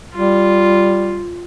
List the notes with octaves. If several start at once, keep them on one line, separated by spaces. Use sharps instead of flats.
G3 F4